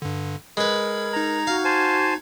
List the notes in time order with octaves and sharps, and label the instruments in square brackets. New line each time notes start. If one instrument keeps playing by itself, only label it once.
[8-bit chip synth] G2 D3
[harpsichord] G#3 B4 [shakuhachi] A#4 [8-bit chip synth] B5 G#6
[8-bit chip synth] D#4 G#6 [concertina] A#5
[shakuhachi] F#4 [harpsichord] F5
[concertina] C5 G#5 A5